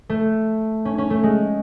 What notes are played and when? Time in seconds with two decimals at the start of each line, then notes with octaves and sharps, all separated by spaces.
0.09 A3
0.85 C#4
0.98 C#4
1.10 A3
1.23 G#3